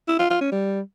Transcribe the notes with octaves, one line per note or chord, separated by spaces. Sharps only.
E4
F4
F4
C#4
G3